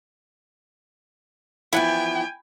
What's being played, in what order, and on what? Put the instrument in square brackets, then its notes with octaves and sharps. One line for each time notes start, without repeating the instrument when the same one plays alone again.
[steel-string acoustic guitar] E3 F3 B3 [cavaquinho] E4 [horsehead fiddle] G5 G#5